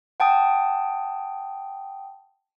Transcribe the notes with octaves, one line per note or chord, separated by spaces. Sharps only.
F#5 G5 A5 D#6